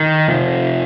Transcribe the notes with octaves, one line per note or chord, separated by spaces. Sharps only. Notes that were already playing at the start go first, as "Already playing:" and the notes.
Already playing: D#3
C3 F3